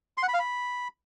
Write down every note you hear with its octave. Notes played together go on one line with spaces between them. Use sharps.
C6
F#5
B5
F5
B5